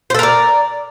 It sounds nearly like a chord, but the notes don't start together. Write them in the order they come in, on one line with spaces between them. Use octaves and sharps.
C5 A4 A#4 D5